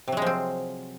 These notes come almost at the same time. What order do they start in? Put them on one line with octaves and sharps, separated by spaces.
C3 F#3 G#3 F3 C4